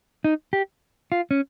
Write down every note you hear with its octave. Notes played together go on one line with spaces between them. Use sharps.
D#4
G4
F4
C#4